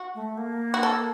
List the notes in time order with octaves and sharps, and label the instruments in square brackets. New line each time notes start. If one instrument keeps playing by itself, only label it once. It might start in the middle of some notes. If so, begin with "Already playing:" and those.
Already playing: [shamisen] F#4
[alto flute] A3
A#3
[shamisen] F#4
A4